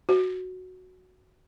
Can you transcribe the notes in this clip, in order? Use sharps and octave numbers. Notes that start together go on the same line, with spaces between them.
F#4